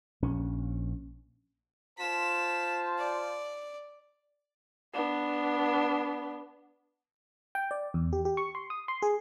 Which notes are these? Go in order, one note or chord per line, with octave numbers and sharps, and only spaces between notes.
A#1 C#4
F4 C5 A5 B6 E7
D5
B3 D4
G5
D5
E2
G4
G4
C#6
C6
D#6
C6
G#4